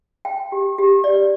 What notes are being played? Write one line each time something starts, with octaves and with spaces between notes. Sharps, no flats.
G5
G4
G4
D5